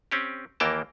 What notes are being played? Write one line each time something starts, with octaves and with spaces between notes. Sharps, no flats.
C4 C#4 G4
D#2 E3 A#3 A#4 G5 A5